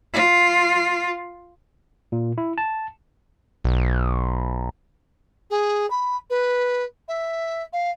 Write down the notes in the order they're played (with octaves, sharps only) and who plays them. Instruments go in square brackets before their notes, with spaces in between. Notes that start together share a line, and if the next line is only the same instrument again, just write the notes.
[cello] F4
[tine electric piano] A#2
E4
A5
[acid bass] B1
[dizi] G#4
B5
B4
E5
F5